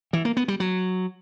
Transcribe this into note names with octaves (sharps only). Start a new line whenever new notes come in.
E3
A#3
B3
G3
F#3